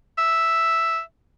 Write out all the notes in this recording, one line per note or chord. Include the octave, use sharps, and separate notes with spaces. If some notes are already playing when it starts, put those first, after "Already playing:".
E5